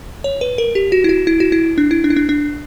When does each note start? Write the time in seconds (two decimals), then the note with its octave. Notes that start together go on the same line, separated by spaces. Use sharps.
0.24 C#5
0.41 B4
0.58 A#4
0.75 G4
0.92 F#4
1.04 E4
1.09 F#4
1.27 E4
1.40 F#4
1.52 E4
1.78 D4
1.91 E4
2.04 D4
2.10 E4
2.16 D4
2.29 D4